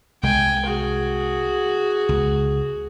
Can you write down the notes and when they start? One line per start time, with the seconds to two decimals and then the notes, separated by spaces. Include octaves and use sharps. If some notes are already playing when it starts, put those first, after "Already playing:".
0.23 C2 G#3 G5 G#5
0.66 F#4 G#4
2.09 C#2